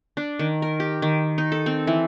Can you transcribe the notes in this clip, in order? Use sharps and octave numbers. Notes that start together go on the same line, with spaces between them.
D4
D#3
A#4
G4
D#3
D#4
A4
C4
E3